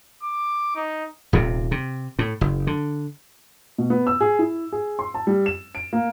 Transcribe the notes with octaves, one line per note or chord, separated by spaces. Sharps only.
D6
D#4
D#1 D#2 C3
C3
A2
F#1
D3
B2
B3
E6
G#4
E4
G#4
C6
A5
G3
E7
D7
A#3